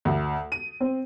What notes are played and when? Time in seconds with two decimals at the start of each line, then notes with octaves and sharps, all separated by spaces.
0.05 D2
0.52 D#7
0.81 C4